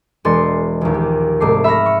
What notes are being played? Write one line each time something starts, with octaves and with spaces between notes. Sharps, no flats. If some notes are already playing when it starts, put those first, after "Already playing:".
E1 G#3 D5 C6 A6 C#7
A#1 D#2
G4
C2 G#2 A3 D6 C7
E5 B5 C#6 F6 A#6
C#6